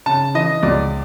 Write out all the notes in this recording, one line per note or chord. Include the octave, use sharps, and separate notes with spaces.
C#3 A5
E3 D#5
C#2 D5